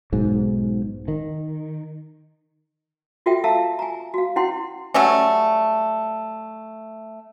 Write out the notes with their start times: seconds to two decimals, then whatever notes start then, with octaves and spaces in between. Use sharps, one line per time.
0.12 B1 G#2
1.08 D#3
3.26 F4 F#4 A4 E5 G5
3.44 A4 E5 F5 A5 A#5 E6
3.79 G#5 A#5
4.14 F#4 F5
4.36 C#4 E4 F#4 F#5 G5 C6
4.94 F#3 G3 A3 C#4